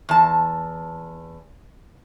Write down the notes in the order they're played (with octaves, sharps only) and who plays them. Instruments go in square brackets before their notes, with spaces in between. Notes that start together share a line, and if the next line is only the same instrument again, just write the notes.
[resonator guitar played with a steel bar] E2 A5